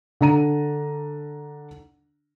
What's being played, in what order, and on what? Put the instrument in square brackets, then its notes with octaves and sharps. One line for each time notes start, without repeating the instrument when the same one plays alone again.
[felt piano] D3 D4 A#5 D#7